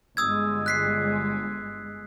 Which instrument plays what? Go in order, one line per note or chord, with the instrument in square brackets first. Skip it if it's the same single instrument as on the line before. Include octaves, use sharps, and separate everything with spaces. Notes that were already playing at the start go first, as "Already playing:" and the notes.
[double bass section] G1 G#3 [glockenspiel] D#6 E6 G#6
[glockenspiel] F#6 B6 C7